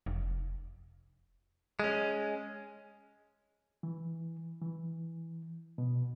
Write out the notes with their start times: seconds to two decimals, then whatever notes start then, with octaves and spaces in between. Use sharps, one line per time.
0.06 F1
1.80 G#3 C#4
3.83 E3
4.62 E3
5.78 B2